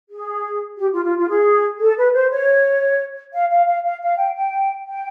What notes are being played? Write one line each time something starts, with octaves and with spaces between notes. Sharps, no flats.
G#4
G4
F4
F4
F4
G#4
A4
B4
C5
C#5
F5
F5
F5
F5
F5
G5
G5
G5